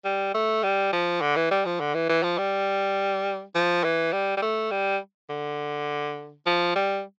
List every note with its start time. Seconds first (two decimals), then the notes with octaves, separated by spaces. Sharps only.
0.05 G3
0.34 A3
0.63 G3
0.93 F3
1.21 D3
1.36 E3
1.51 G3
1.65 F3
1.80 D3
1.94 E3
2.09 E3
2.23 F3
2.38 G3
3.55 F3
3.84 E3
4.13 G3
4.37 G3
4.42 A3
4.71 G3
5.30 D3
6.46 F3
6.76 G3